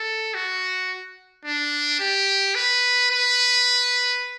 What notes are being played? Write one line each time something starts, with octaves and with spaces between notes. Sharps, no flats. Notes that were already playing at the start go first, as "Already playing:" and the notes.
Already playing: A4
F#4
D4
G4
B4
B4